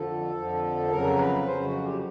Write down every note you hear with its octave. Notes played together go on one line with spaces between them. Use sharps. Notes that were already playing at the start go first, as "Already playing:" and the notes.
Already playing: F2 D3 F3 A4
F2 D3 F3
F2 C#3 F#3 A#4
B4
F2 C#3 F#3 C5
F#4
G4